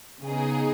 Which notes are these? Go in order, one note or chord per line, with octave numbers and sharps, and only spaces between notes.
C#3 B3 D#4 G#4